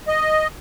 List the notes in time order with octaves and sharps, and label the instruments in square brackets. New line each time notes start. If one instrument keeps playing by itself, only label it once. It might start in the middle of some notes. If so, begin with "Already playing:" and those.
[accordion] D#5